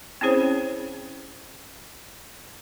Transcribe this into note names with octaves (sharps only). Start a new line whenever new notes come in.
C4 C#4 E4 G#4 C5 C#5